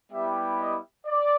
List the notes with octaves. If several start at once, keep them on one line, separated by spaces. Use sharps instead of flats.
G3 B3 E4 G4 E5
D#5
D5